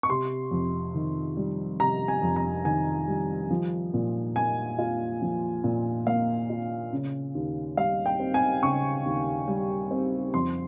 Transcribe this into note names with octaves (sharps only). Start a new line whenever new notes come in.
C#6
C3 C6
F2
D#3
G3
C3 A#5
G#5
F2
A#5
D#3 G#5
G3
F3
A#2
A#3 G#5
F4
F3
A#2
A#3 F5
F4
C#3
D#2
G3 F5
G5
C4
G#5
C#3 C#6
D#2
G3
C4
F2 C6